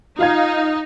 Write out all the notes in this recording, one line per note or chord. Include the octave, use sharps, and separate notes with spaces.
D#4 F4 F5 G#6